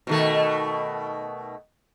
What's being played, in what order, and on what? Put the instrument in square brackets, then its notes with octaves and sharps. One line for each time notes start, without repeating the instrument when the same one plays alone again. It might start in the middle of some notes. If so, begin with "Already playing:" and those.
[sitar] B2 D#3 A3